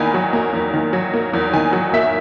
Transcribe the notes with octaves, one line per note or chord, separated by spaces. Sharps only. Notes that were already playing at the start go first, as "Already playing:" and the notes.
Already playing: E2 D#3 A#3 G#5 A#5 B5
F#3
A#3
E2
D#3
F#3
A#3
E2
D#3 G#5
F#3
A#3 E5